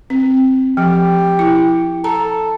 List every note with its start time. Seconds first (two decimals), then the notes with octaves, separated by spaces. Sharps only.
0.10 C4
0.77 F3 G4
1.39 E4
2.04 A4 A#5